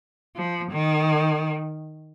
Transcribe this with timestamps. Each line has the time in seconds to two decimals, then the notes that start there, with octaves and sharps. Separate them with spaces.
0.36 F3
0.71 D#3